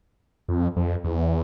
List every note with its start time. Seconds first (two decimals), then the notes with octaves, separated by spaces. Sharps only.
0.48 F2
0.76 F2
1.04 E2